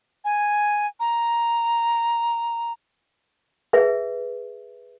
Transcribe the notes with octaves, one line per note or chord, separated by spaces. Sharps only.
G#5
A#5
G#4 B4 E5